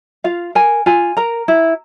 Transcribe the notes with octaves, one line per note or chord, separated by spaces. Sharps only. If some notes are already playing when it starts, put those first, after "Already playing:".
F4 F5
A#4 G#5
F4 G#5
A#4 A#5
E4